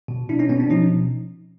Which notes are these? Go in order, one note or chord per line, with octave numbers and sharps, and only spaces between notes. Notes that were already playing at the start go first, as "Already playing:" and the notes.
B2
B2 D4 E4
C#4 D#4
B2 B3 C#4
C4 D4
F3 C#4 D#4